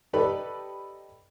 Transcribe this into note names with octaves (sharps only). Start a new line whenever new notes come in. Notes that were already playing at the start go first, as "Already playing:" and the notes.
D#4 G4 A4 B4 D5 B5